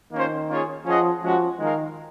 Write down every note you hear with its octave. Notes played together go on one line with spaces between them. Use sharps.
D#3 A#3 C#4 F4 C5
A#3 C#4 F4 G#4 C#5
F3 C#4 G#4 D#5 F#5
F3 G#3 C#4 F#4
D#3 G#3 D#4 A#4 F5